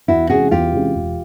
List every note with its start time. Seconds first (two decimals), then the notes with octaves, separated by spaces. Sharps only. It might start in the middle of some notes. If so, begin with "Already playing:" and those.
0.08 E2 E4 F#4
0.30 C3 E3 G#3 C#4 F#4 G#4
0.51 E2 F4 G4
0.72 C3 E3 G#3 C#4
0.95 E1